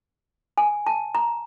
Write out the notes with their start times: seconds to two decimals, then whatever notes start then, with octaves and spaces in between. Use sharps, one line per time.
0.58 G#5
0.87 A5
1.15 A#5